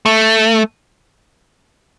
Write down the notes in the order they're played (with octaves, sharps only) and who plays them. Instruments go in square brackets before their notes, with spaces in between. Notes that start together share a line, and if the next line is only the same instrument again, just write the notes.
[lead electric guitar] A3